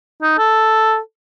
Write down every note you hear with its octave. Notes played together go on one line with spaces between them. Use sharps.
D#4
A4